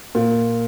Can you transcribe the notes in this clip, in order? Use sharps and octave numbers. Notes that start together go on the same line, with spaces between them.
A#2